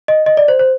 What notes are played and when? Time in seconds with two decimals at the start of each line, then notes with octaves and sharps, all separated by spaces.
0.08 D#5
0.26 D#5
0.37 D5
0.48 C5
0.59 C5